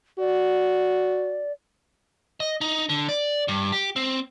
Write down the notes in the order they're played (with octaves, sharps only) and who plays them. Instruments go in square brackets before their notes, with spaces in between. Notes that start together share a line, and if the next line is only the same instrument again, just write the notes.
[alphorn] F#4 [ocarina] D5
[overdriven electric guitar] D#5
D#4
D3
D5
G2
G4
C4